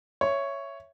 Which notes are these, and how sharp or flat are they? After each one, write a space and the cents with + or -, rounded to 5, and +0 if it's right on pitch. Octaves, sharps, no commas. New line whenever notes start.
C#5 +0 E5 +10